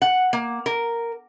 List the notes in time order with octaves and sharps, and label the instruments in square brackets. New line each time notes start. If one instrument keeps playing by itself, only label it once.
[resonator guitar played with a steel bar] F#5
A#3
A#4